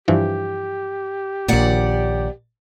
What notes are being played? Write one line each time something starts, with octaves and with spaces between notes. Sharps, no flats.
G2 E3 F3 G4
A#1 D#2 A#2 D5 F#5